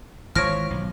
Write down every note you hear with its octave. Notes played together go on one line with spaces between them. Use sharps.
G#1 E3 F3 C#5 F6 A#6 D7
B1